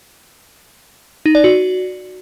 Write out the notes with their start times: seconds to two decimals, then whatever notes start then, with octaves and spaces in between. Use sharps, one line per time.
1.26 D#4
1.35 D5
1.44 F#4